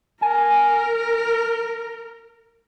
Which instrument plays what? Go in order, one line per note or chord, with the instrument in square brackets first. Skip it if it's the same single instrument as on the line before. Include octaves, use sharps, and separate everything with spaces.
[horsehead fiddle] A#4 [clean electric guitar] G#5